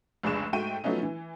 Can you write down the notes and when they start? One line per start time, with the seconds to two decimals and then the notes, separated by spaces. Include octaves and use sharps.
0.23 F1 C#2 D4 G#4 C#6 E7
0.53 G#2 A3 F#4 G5 C#6 D#7
0.84 F3 F#3 A3 B3 C#4 D#4
1.03 E3